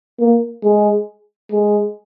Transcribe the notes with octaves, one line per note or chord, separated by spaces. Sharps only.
A#3
G#3
G#3